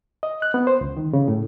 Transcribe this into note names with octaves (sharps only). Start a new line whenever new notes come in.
D#5
F#6
B3
C5
C#2
D#3
C#3
A2